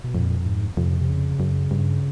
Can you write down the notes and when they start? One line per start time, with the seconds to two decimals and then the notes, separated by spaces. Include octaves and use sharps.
0.04 B2
0.14 F2 A#2
0.46 G#2
0.77 F2 C3
1.01 C3
1.09 C#3
1.40 F#2
1.71 G2